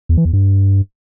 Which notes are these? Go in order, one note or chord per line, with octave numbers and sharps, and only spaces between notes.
E2
E3
E2
G2